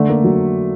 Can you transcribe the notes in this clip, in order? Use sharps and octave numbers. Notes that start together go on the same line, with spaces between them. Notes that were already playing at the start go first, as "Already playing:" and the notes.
Already playing: D3 A3
A#3
F#3